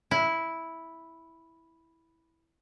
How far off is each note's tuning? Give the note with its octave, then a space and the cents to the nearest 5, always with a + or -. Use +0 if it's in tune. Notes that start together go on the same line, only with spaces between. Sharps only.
E4 -5